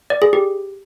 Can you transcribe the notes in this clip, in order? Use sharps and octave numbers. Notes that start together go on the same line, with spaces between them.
D5
G#4
G4